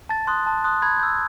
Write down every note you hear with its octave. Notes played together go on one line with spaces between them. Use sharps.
A5 A6
C6 D#6 F#6
A5
C6 D#6 F#6
B5 G#6
E6 G6